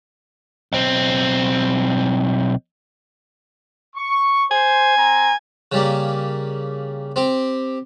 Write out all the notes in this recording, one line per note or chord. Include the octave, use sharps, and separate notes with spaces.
B1 C4
C#6
C5 G#5
C4 A#5
C#3 G3 A#3
C4 G4